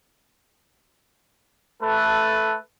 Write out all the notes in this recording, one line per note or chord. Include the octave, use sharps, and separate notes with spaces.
A3 A4 B4